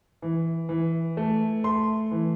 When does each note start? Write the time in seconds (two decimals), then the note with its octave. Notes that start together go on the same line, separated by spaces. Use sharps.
0.22 E3
0.69 E3
1.17 A3
1.64 A3 C6
2.11 E3